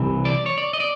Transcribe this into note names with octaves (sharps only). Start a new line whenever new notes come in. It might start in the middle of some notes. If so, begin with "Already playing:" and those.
Already playing: C2 C3 E3
D5
C#5
D5
D#5
D5